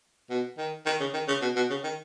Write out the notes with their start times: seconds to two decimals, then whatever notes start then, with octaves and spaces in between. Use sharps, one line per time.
0.30 B2
0.58 D#3
0.86 D#3
1.00 C#3
1.14 D#3
1.28 C#3
1.42 B2
1.56 B2
1.70 C#3
1.84 D#3